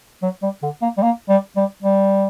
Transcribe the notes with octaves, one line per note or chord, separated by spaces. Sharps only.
F#3
G3
D3
A#3
G3
A#3
G3
G3
G3